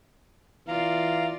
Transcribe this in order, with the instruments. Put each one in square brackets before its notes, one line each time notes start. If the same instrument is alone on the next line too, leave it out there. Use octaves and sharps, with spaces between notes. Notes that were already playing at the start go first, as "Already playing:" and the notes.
[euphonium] E3 [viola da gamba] F4 D5 [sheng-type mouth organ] F5 A#5